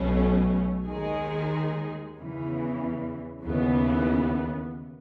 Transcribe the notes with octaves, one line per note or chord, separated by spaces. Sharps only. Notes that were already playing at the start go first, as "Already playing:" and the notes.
Already playing: B1 B2 A3 C#4
D#2 D#3 G#3 D#4 G#4
E2 C#3 E3
D#2 C#3 E3 B3